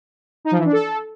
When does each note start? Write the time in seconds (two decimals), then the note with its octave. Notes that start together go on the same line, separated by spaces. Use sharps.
0.45 D#4
0.52 F3
0.58 E3
0.65 D4
0.72 A4